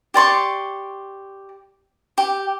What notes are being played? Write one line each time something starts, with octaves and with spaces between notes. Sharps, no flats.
G4 D5 C6 C#6
G4